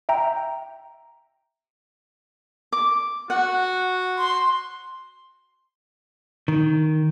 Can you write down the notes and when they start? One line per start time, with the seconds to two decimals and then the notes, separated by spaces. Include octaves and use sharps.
0.09 E5 G5 A#5
2.72 D6
3.30 F#4 F#5
4.18 C6
6.48 D#3